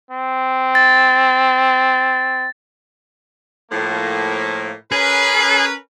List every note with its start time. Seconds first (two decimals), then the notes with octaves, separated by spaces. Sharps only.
0.11 C4
0.75 A6
3.72 A2 F3 A#3
4.92 C#4 G#4 A#4 B4